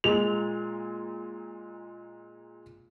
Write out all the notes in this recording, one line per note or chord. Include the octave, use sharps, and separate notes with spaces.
A#2 G#3 F7